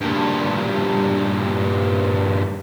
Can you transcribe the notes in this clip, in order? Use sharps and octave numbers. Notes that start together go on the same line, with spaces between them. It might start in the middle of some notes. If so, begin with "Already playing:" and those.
G2 A#2